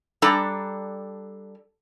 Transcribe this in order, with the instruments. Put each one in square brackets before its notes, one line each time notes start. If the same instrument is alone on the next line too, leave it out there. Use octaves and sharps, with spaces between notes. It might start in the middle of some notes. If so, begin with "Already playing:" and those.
[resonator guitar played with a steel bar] G3 D4 A4 A#5